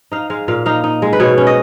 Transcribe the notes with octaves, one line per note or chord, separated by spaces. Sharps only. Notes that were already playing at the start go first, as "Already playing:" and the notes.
D#4 F5
G#3 F5
A#2 F5
D#4 F5
D#4
G#3
B4
B2 C#5
C#4
D#5